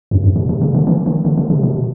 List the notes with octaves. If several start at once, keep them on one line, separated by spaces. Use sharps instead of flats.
F#2
F#2
B2
C3
C#3
D3
E3
D#3
D3
D3
C3
B2
C3
B2